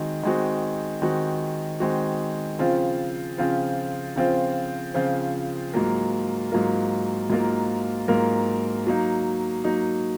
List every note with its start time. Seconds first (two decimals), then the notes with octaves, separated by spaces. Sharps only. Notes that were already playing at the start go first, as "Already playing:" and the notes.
Already playing: D#3 G#3 C4 F#4
0.23 D#3 G#3 C4 F#4
1.02 D#3 G#3 C4 F#4
1.80 D#3 G#3 C4 F#4
2.59 C#3 F3 C4 F4 C5
3.38 C#3 F3 C4 F4 C5
4.16 C#3 F3 C4 F4 C5
4.94 C#3 F3 C4 F4 C5
5.74 G#2 F#3 A#3 F4 A#4
6.51 G#2 F#3 A#3 F4 A#4
7.30 G#2 F#3 A#3 F4 A#4
8.08 G#2 F#3 A#3 F4 A#4
8.87 F#3 A#3 D#4
9.64 F#3 A#3 D#4